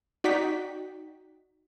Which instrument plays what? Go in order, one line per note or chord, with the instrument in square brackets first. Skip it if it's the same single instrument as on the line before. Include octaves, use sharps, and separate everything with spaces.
[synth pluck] D#4 F#4 D5 G5 B6